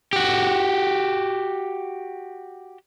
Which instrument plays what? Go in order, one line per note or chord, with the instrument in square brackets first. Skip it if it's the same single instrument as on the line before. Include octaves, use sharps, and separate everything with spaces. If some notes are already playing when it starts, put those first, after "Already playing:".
[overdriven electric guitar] F#4 G4